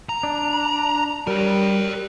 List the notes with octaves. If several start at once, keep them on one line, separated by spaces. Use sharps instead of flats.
A#5
D4
G3 A#4 C#5